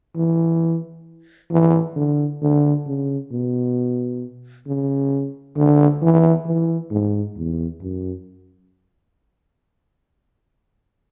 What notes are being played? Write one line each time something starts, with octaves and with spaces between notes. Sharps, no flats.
E3
E3
D3
D3
C#3
B2
C#3
D3
E3
E3
G#2
E2
F#2